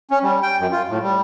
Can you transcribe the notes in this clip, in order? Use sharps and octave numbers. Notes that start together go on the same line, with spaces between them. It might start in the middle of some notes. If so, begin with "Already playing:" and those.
C#4
G3
G5
F#2
F4
A2
G3